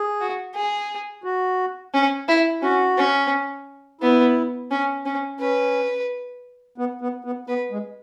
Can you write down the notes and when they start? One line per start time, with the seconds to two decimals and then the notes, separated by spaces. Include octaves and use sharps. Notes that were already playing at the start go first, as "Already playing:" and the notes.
Already playing: G#4
0.21 F#4
0.55 G#4
1.24 F#4
1.94 C#4
2.28 E4
2.62 C#4 F#4
2.97 C#4
4.01 B3 E4
4.71 C#4
5.05 C#4
5.39 C#4 B4
6.78 B3
7.01 B3
7.24 B3
7.47 B3 B4
7.71 G#3